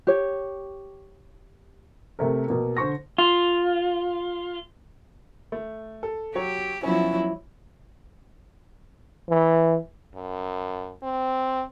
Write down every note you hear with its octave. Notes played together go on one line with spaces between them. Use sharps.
G4 C#5
C3 A3 A#4
B2 A#3
D3 C5 C#6 A#6
F4
A3
A4
F#3 G4 C#5
F3 F#3 B3 C#4 E4
E3
F#2
C4